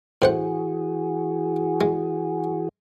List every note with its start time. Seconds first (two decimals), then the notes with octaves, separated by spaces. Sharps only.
0.22 A2 E3 F#4 G#4 C5 F#5
1.81 G#3